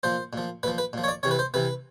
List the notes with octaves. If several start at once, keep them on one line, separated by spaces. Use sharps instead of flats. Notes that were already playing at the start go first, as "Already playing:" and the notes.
A#2 F3 C5
A#2 F3
A#2 F3 B4
B4
A#2 F3
C#5
D5
C3 E3 C#5
B4
C5
C3 E3 B4